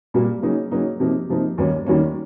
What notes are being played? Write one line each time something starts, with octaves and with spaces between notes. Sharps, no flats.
A#2 G3 A#3
C#3 F#3 A#3 D#4
C#3 F#3 A#3 D#4
C3 F3 A#3 D#4
C3 F3 A#3 D#4
D#2 D#3 G3 A#3 C#4
D#2 D#3 G3 A#3 C#4